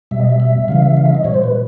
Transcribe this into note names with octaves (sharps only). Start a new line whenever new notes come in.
B2 G3 E5
D#5
E5
E5
C#3 E3 G3 F5
E5
F5
E5
D#5
A#2 G3 C#5
C5
B4